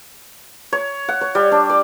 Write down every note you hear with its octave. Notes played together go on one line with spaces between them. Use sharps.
C#5
F#5
C#5
G3
D4
D5